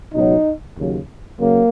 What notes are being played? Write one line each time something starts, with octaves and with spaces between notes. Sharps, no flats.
C#2 B2 F#3 D#4
D#2 C#3 F#3
C#3 F#3 A#3